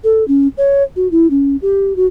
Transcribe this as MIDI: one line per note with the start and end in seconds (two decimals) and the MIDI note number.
0.04 0.26 69
0.28 0.48 61
0.57 0.83 73
0.96 1.08 66
1.11 1.30 64
1.30 1.56 61
1.62 1.93 67
1.96 2.06 66